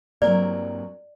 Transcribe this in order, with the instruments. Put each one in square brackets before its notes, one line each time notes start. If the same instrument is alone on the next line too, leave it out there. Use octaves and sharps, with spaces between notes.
[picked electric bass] G2 A#3 [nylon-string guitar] F#3 C4 A#4 [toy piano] D5